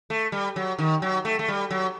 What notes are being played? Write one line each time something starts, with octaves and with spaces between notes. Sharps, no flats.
A3
G3
F#3
D#3
F#3
A3
A3
G3
F#3